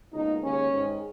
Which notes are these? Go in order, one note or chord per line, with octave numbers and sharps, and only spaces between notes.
C#2 B2 A#3 D#4
D#2 C#3 G#3 C#4
G#2 D#3 G#3